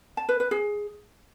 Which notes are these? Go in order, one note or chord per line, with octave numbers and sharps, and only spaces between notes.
A5
B4
B4
G#4